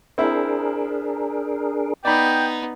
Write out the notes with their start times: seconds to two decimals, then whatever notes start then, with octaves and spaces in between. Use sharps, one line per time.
0.18 C4 D4 E4 G#4 A#4
2.05 B3 D#4 D5 G5 B5